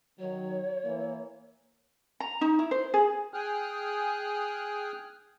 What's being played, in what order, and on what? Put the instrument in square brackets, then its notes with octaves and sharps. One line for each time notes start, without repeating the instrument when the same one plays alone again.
[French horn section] D#3 F#3 [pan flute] C#5
[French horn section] E3 A#3
[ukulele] A#5
D#4
E4
C5
G#4
[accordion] G#4 G5 G#5 D#6 F6 F#6